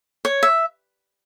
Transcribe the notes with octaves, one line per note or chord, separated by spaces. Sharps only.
C#5
E5